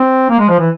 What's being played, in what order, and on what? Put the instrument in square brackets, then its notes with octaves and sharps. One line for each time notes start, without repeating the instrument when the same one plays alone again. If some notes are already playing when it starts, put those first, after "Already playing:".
Already playing: [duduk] C4
A#3
G#3
F3
E3